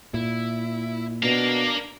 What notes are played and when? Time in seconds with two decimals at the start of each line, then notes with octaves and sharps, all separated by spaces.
0.14 A#2 E4
1.23 B2 D4 A#4 F5